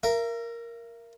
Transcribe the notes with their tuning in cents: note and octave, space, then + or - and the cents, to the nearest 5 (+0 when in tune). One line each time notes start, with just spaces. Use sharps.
A#4 +0 E5 +45